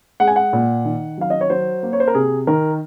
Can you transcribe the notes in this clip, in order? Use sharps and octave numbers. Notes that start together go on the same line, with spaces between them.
G#3 F#5
G#5
F#5
A#2
D#3
F#3 F5
D#5
C#5
F#3 C5
A#3
C#5
C5
A#4
C3 G#4
D#3 A#4